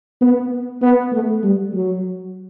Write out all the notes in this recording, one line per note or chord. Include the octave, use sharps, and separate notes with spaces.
B3
B3
A3
G3
F#3